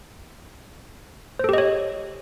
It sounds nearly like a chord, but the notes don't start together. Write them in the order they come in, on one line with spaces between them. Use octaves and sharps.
C5 A4 G4 D#5 C#5